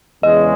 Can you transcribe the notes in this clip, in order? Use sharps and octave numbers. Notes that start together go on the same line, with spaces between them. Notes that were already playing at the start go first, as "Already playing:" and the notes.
E2 C#3 G#3 D#5